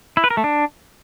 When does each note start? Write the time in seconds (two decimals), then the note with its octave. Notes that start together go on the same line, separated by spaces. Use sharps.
0.17 E4
0.24 B4
0.30 A#4
0.37 A3
0.44 D4